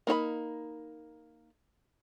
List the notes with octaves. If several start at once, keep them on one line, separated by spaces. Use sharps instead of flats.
A#3 D#4 C#5 B5